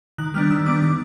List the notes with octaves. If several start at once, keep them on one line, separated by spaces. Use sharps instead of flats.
D#3 F#6
G3 B3 D4 F6
D#3 E6
G3 B3 D4 D6
D#3